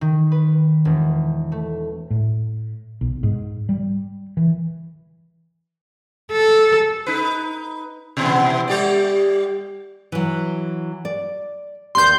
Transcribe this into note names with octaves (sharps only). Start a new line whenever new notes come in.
D#3
B4
E1
A3
A2
B1
G#2
G3
E3
A4
D#4 B4
B2 E3 B3
G3 G4 D5
E3 F#3
D5
D#2 D4 G4 C6 G6